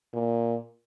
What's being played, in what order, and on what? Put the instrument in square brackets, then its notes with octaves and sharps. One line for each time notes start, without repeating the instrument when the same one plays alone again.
[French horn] A#2